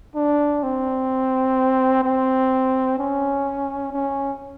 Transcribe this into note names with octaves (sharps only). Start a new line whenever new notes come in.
D4
C4
C4
C#4
C#4